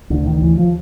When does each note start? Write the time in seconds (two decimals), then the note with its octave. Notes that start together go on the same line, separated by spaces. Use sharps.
0.10 D2 D3
0.26 D#3
0.42 D#2 E3
0.58 F3